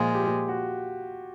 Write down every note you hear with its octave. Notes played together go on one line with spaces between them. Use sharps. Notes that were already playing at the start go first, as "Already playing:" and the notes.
Already playing: A#2 F3 G#3 F4
G4
F#4